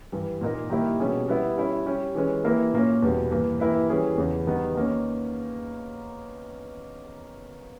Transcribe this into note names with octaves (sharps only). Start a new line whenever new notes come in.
G2 E3 G3
A#2 A#3 D#4 A#4
D#3 G3 A#3 E4 G4
B2 G3 C#4 G#4
G3 B3 E4
G3 C#4 E4
G3 C#4 G4
E3 G#3 C#4
E3 A#3 E4 G4 A#4
A#2 A#3 C#4
E2 B2 G3
G2 E3 A#3
E3 A#3 E4 G4 B4
E3 G3 C#4 G#4 B4
E2 C#3 E3
E2 D#3 G3 B3
D#3 A#3 C#4